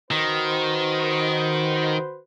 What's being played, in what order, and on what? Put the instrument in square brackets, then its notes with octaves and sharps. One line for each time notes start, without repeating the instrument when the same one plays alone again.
[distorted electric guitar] D#3 [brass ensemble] F#4 B4 C5